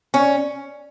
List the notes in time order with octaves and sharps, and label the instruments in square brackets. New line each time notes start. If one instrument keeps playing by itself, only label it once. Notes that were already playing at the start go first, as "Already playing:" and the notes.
[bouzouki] C#4